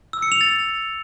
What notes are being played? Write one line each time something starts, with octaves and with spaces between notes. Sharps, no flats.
E6
C#7
F7
A6